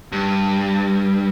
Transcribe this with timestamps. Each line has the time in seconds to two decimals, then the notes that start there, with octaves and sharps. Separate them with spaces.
0.12 G2